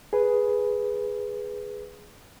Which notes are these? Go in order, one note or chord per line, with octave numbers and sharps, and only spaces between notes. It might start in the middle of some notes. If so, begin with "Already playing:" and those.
G#4 B4